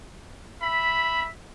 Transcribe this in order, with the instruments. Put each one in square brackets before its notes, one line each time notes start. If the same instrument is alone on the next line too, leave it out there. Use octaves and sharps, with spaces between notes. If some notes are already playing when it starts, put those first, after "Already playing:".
[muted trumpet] E5 [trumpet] B5